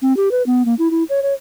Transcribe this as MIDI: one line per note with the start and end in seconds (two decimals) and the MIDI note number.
0.02 0.15 60
0.17 0.29 67
0.32 0.43 71
0.46 0.65 59
0.65 0.74 58
0.79 0.90 64
0.91 1.03 64
1.09 1.20 73
1.23 1.33 73